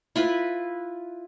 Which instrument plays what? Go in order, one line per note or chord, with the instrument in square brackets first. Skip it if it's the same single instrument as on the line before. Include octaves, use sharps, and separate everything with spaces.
[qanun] E4 F4 B4